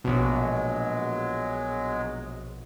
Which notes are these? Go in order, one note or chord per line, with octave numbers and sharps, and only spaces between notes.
A#1 B2 F#3 G#3